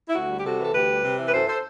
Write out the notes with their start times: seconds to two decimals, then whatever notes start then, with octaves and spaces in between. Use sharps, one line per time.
0.09 E4
0.15 D2 F#4
0.30 G3
0.38 G4
0.45 C3 F#4 A4
0.60 E3 A4
0.74 D2 G4 B4
0.90 G3
1.04 C3
1.19 E3
1.27 B4
1.34 F#2 A4 C5
1.48 A4 C5